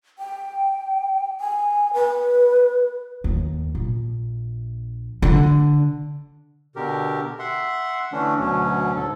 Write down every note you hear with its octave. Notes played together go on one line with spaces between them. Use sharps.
G5
G#5
B4
D#2
A#1
D3
B2 D3 G4 A#4
E5 F#5 C6
D3 E3 A3 C#4 D4
D2 B2 F#3 C#4
D2 G#2 A4